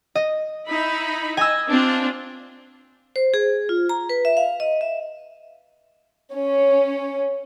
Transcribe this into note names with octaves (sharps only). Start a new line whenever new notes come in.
D#5
D#4 E4 B5
D#5 G#5 E6
C4 D4 F4
C5
G#4
F4
A#5
B4
E5
F5
D#5
E5
C#4